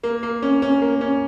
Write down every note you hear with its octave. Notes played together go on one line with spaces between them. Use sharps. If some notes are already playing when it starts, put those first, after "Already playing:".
A#3
A#3
C#4
C#4
A#3
C#4